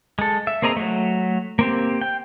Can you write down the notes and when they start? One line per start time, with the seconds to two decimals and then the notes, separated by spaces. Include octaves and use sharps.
0.19 G#3 A4
0.47 E5
0.62 A#3 C4 G#4 D#5 A#5
0.77 F#3 A3
1.59 A#3 C4 G4
2.01 G5